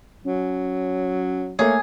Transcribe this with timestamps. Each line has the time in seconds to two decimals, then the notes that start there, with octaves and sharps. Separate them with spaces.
0.25 F#3 C#4
1.59 A3 A#3 G#4 C#5